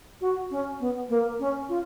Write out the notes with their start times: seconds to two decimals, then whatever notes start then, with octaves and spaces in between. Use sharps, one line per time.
0.21 F#4
0.51 C#4
0.80 B3
1.09 A#3
1.39 C#4
1.69 F4